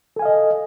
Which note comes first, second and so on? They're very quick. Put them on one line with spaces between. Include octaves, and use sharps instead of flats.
A4 G#5 F5 D#5